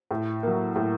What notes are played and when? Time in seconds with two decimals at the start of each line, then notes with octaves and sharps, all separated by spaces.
0.11 A2
0.43 F#3 A#3
0.76 A2